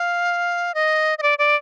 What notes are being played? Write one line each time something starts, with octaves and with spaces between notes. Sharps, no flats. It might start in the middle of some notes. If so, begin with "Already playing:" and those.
Already playing: F5
D#5
D#5
D5
D5